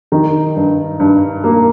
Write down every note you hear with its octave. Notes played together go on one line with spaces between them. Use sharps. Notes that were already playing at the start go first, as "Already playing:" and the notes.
D#3 D#4
G2
G2
A#3